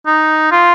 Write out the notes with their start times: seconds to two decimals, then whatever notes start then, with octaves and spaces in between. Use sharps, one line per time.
0.07 D#4
0.52 F4